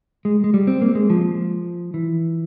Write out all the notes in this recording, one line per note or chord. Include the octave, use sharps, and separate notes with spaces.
G#3
G#3
G3
C4
A#3
G#3
F3
E3